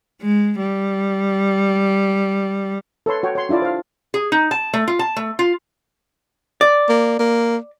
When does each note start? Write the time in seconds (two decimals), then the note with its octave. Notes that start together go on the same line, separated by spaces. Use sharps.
0.22 G#3
0.59 G3
3.06 A4 B4 C#5 C6
3.23 F#4 C#5 G5
3.35 C#5 C6
3.49 D4 E4 F4 D5 A5
3.62 C5 F5
4.14 G#4
4.32 D#4
4.51 A5
4.73 A3
4.88 F4
4.99 A5
5.16 A3
5.39 F4
6.61 D5
6.89 A#3
7.19 A#3